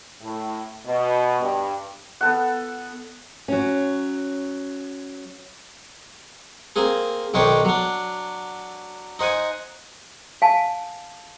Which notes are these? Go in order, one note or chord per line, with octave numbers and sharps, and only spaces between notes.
A2
B2
G2
B3 A4 F#5
F#3 C#4
A#3 C4 G#4
B1 D#3 D4 C5 C#5 G5
F#3 D4
D#4 C5 F#5 G#5
F5 G#5 A5